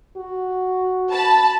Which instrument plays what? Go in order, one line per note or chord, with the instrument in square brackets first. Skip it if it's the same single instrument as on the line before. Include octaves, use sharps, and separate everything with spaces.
[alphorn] F#4
[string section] A5 B5